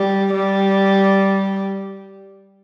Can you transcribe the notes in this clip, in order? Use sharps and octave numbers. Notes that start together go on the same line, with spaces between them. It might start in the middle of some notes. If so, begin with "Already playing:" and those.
Already playing: G3
G3